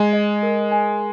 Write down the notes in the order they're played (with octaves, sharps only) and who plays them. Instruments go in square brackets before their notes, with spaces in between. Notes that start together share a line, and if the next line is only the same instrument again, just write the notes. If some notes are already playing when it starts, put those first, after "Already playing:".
Already playing: [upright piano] G#3 [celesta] G#5
[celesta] D#5
A#4
G#5